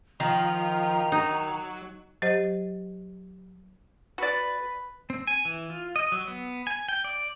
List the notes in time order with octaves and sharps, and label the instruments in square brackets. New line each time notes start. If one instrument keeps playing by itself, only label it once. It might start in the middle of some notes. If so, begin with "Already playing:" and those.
[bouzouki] D#3 [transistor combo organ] F3 [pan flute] A#5
[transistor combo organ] F#3 [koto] D#4
[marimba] F#3 G4 C5 D#5
[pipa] F#4 D5 [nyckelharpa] B4
[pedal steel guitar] C4
G#5
E3
F4
D#5
F#3
B3
G#5
G5
D5